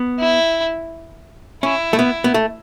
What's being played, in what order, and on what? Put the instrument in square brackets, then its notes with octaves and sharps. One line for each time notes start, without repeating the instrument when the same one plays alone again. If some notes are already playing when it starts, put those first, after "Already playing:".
Already playing: [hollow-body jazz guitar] B3
[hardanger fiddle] E4
[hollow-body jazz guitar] C#4 [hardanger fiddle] E4
[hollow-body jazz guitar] A3
B3
B3
A3